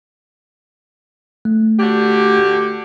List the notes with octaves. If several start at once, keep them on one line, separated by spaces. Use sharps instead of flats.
A3
D3 F#4 G4